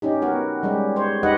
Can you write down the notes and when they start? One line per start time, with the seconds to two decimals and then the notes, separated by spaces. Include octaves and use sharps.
0.02 C#4 D#4 G4
0.22 B3 F#4 A#4
0.63 G3 G#3 C#4 G4
0.96 C5 C#5
1.23 D#4 G4 B4 D#5 F#5